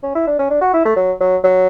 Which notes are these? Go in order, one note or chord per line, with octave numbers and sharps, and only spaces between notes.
C#4
E4
D4
C#4
D4
F#4
E4
A3
F#3
F#3
F#3